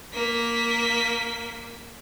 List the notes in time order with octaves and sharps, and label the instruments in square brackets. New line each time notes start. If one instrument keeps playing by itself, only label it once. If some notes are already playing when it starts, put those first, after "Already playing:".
[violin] A#3 B6